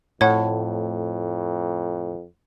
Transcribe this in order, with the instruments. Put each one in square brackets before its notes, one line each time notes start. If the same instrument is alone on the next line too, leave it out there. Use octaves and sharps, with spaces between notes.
[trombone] F2 [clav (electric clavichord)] A2 [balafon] C#5 F#5